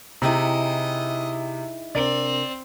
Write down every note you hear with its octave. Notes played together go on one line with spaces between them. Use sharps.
C3 D#4 E4 G#4 D#5 G5 A#5
C3 C4 D4 A#4 D5